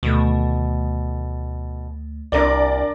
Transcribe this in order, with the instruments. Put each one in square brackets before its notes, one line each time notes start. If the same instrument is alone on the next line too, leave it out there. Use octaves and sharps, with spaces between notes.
[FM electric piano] D2 D#3 A3 [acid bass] B2
[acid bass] C2 [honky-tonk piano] D4 A#4 D5